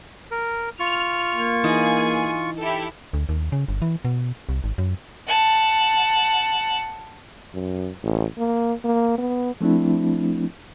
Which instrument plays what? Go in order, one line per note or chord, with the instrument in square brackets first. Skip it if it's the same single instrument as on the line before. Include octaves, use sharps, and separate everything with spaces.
[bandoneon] A#4
[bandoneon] F4 C#6 [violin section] F6
[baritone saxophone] A#3
[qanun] E3 D#4 [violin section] G#4 G#5 G#6
[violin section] E4 G4 A4
[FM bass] D2
D#2
C#3
G1
E3
B2
C2
G#1
F#2
[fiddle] F#5 A5
[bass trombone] F#2
A1
A#3
A#3
B3
[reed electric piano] F3 A3 C4 D4 E4